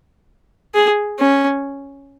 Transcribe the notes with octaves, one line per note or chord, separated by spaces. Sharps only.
G#4
C#4